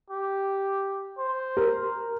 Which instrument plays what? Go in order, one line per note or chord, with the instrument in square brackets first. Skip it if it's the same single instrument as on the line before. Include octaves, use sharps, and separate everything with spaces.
[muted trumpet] G4
C5
[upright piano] A#4